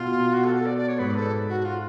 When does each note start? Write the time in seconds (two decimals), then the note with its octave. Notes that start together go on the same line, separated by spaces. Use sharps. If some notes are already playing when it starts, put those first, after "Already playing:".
Already playing: B2 F4
0.33 F#4
0.44 A4
0.55 A4
0.66 D5
0.78 D5
0.88 C#5
0.99 G#2 B4
1.15 A4
1.48 F#4
1.65 F4